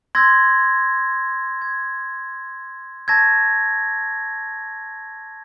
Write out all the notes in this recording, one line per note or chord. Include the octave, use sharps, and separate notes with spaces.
C6 E6 G6 G#6 A#6
G#6
A5 C#6 E6 G#6 A#6